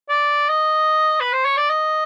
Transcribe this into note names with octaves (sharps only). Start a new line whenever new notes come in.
D5
D#5
B4
C5
C#5
D5
D#5